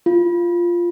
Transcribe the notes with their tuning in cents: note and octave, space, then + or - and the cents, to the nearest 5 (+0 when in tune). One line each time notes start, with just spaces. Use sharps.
F4 -5